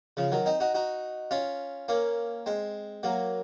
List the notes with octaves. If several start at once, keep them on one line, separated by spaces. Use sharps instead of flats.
C#3 F3
D#3 F#3
C4 D#4
D#4 F#4
D#4 F#4
C#4 F4
A#3 C#4
G#3 C4
F#3 A#3